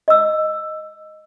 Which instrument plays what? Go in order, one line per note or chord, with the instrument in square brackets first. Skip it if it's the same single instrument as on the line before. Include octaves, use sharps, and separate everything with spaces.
[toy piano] D#5 E6